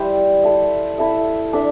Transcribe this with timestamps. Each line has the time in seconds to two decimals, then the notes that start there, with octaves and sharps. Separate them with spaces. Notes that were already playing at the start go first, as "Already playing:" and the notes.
Already playing: G3 E4 C5
0.44 E4 A4 E5
0.98 E4 A4 E5
1.53 D4 A4 E5